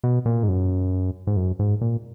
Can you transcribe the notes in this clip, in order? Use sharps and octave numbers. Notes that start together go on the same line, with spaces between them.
B2
A#2
G#2
F#2
G#2
F#2
G#2
A#2